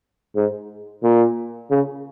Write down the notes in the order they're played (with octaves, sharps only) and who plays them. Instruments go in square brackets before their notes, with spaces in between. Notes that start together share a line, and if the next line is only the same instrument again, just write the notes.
[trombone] G#2
A#2
C#3